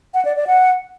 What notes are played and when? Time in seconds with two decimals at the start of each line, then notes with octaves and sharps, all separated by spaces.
0.14 F#5
0.25 D5
0.36 D5
0.47 F#5